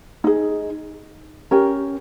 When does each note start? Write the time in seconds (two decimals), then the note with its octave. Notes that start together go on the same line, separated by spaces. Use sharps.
0.24 D#4 G#4
1.51 C#4 G4 A#4